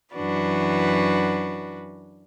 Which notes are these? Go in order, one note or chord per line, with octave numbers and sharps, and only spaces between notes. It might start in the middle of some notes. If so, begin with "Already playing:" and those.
F#2 E3 D4 F#4 B4